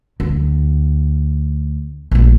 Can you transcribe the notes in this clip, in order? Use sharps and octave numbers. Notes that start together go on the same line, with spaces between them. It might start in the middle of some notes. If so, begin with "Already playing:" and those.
D2
A#1 A3